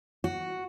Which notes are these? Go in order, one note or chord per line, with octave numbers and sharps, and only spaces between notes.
F#4